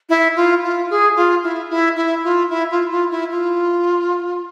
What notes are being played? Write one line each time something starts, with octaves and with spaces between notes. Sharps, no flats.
E4
F4
F4
G#4
F4
E4
E4
E4
F4
E4
F4
F4
E4
F4